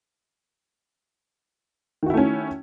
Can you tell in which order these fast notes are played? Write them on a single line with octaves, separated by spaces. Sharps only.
D#3 F#4 E4 A3 C#4